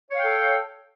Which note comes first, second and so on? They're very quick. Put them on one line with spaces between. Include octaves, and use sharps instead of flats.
C#5 F5 G5 A4